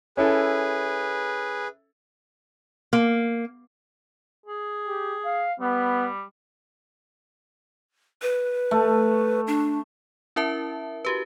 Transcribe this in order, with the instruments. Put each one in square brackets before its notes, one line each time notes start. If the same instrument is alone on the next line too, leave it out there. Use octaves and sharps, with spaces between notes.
[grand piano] C#4 E4 A4 [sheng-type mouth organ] G#4 B4
[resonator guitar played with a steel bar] A#3
[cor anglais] G#4
[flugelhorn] G4
F5
[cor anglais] G3 [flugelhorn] B3
[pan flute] B4
[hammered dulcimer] A3
[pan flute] D4
[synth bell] C#4 E4 A#4 E5 A5
F#4 G4 B4